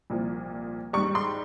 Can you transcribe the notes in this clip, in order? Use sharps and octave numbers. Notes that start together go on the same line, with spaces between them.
C2 A#2 F3
G#2 G3 C#6
C6